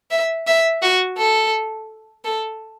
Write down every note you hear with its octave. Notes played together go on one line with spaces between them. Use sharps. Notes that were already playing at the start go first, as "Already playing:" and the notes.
E5
E5
F#4
A4
A4